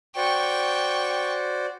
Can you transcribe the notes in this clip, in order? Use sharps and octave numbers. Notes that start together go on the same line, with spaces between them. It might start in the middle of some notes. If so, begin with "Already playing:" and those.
F#4 C5 D5 G5 C#6